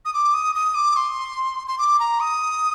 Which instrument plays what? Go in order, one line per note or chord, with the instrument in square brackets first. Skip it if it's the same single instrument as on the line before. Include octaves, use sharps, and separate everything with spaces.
[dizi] D#6
D6
D#6
D#6
D6
C6
C6
D6
A#5
D#6